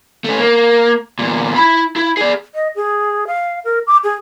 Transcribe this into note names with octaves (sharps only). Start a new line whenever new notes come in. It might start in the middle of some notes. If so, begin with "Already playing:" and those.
A3 C#4
A#3
E2 A#2
E4 B5
E4
G#4 D5
D#5
G#4
F5
A#4
D6
G#4